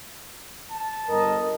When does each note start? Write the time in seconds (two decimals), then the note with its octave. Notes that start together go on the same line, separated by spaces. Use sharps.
0.71 A5
1.09 G1 A#4 D#5